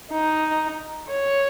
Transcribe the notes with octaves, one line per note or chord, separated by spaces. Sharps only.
D#4
C#5